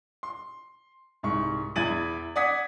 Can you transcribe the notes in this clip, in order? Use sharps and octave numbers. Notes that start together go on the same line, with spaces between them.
C6
C2 G#2 C#6
E2 E4 G#6 A6 D#7 F#7
D5 F#5 D#6 G#6 B6